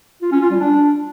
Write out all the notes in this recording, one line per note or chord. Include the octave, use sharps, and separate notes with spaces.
F4
C#4
F4
G3
D4